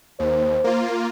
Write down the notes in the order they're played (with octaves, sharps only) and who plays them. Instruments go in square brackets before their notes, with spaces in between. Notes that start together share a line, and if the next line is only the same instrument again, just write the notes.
[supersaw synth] D#2 [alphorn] C5
[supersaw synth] A#3 F4